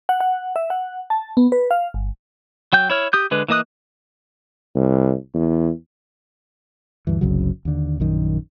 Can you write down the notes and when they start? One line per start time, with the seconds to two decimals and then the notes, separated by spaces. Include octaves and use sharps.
0.09 F#5
0.20 F#5
0.56 E5
0.70 F#5
1.10 A5
1.37 B3
1.52 B4
1.71 F5
1.94 G1
2.73 F#3 G5 G6
2.90 E4 C#5 F6
3.13 G4 D#6 G6
3.31 D3 G#3 B4
3.49 E3 A#3 D#5 D#6 F#6
4.75 C2
5.34 E2
7.07 D2 G2 E3
7.21 F#1 C2 C#3 F#3
7.65 D#2 D3
8.00 A#1 F#2 D#3